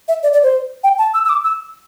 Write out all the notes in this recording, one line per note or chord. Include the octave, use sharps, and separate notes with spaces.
E5
D5
D5
C5
G5
A5
E6
E6
D6
E6